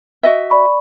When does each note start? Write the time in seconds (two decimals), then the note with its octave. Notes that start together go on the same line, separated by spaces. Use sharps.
0.23 F#4 D#5 E5
0.50 D5 B5 C#6